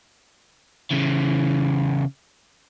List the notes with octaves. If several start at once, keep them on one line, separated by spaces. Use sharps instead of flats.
C#3 E3